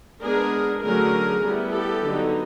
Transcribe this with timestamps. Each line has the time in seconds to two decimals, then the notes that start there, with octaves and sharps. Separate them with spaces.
0.23 G#3 B3 D4 G#4 A#4
0.83 D3 F#3 A3 C#4 G#4 A#4
1.43 G3 B3 E4
1.73 G4 A4
2.04 D3 F#3 B3 D#4